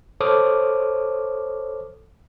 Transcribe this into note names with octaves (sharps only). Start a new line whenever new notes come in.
A4 C5 C#5 D6 D#6 F6